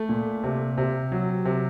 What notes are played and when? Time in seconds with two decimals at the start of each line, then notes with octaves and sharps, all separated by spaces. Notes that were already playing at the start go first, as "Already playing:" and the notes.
Already playing: A3
0.09 A#2
0.43 C3
0.78 C3
1.12 F#3
1.45 C3